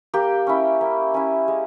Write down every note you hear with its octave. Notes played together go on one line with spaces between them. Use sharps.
A#3 G4
C#4 E4
A#3
C#4 E4
G#3